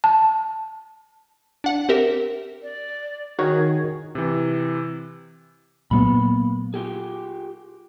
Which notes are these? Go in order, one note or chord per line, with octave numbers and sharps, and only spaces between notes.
A5
D4 F#5
C4 G4 A#4 E5
D5
D#3 F#4 G#4 C#5
C3 E3
A#2 F#3 A#3 B3 B5
F4 G4 G#4